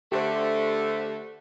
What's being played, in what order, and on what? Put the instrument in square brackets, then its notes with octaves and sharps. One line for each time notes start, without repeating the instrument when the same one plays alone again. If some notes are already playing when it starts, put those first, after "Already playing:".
[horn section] D3 A3 [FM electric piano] G4 C5